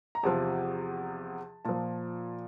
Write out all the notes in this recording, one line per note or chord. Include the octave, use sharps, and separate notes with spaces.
A#5
E2 C3 F3 A5
A#2 F3 A5